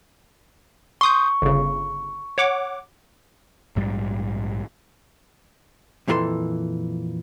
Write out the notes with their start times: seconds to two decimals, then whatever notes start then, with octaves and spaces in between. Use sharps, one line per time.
1.01 C6 C#6 D#6 G6
1.42 G1 C#3
2.38 C#5 F#5 D6
3.76 A#1 G#2 G3
6.08 F2 A#2 E3 F#4 A4 C6